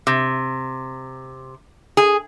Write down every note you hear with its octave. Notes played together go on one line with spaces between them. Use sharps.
C3
G#4